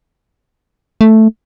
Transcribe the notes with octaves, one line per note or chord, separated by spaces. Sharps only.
A3